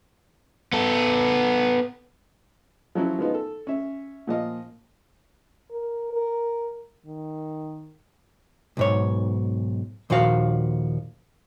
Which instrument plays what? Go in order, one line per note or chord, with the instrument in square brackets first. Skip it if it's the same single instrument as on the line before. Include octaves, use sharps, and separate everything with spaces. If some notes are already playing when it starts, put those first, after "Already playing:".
[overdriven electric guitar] B3 A4
[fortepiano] F3 F#3 C#4 E4
F3 G#3 B3 D#4 F4
A4
C#4 E5
A#2 F3 D#5 F5
[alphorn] A#4
A#4
D#3
[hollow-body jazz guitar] B1 G#2 C#5
D#2 A#2 F3 F#4 F5